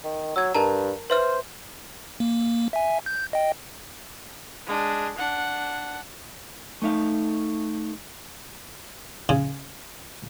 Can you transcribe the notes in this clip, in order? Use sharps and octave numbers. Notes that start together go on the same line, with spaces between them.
D#3
F#3 E6 G#6
G2 A#4 A5 A#5
B4 C5 E5 F6
A#3
E5 G#5
G6
D#5 G5
G#3 D4
D4 F#5
A3 D#4 E5 F5
C#3